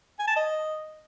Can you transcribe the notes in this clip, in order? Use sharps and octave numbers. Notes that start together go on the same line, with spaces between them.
G#5
A5
D#5